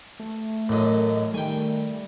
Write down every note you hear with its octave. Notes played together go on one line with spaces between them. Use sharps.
A3
A1 F#2 A2 A#4 D#5
D#3 G3 A3 G5 G#5